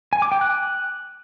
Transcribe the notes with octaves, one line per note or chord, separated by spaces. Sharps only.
G#5
D6
G5
F#6